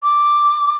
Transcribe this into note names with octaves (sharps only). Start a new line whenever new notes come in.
D6